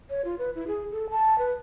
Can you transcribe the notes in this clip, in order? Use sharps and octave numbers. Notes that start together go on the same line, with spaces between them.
C#5
F4
B4
E4
G#4
A4
A5
B4